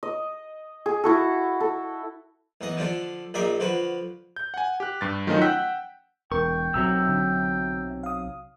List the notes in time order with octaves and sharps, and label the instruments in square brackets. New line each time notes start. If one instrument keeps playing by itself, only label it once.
[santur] D#5
G#4
E4 F#4 A4
A4
[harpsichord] A1 B3 D#5
D3 F3 D4 A4
A#1 A#2 D#4 D5 E5 D6
D3 F3 F#4 B4
[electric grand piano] G6
F#5 G#5
G4 F#6
G2 A6
D#3 F3 F#3 A3 C#4 D#4
F#5 G5 E6 F#6 G6 B6
[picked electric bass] E1 [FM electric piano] A#4 [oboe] G5 [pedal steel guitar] C#6
[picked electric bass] B1 C3 F#3 [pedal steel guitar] E5 A#5 E6
[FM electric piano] D3
F5 D#6